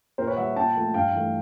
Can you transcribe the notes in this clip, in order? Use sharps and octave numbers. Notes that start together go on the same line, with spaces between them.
A#2 A#4 C5
B4 C#5
G3 E5 F#5
A#2 G5 A5
F3 A3
G2 F5 G5
E3 A3